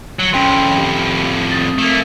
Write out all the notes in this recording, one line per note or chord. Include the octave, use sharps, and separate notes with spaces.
F#3
F2 A2 C#4 G5 C6
G4
C4 D#6 A6
A3 A#3